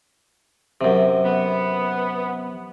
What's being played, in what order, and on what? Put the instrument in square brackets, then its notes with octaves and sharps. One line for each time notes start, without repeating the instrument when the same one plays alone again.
[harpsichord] F#2 C3
[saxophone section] B3